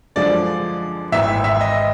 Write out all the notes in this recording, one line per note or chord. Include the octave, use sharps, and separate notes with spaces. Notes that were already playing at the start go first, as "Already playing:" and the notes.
F#2 D3 F3 G#3 D5
G#1 G#2 E3 E5
E5
D#5